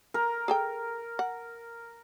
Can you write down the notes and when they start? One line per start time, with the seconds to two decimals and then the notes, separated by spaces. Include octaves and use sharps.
0.14 A#4
0.48 G#4 A4 G5
1.19 F#5